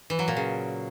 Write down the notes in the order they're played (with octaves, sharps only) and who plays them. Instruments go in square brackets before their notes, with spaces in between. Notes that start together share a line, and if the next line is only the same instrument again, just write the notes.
[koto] E3
F#3
A#2
C#3